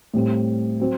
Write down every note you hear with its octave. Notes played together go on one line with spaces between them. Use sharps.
A2 G3 C4
F#3 C4